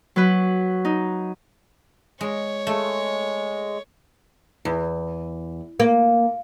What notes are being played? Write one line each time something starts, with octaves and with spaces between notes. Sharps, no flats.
F#3 B4
D#4
G#3 C#5
G#3 A3
E2
A#3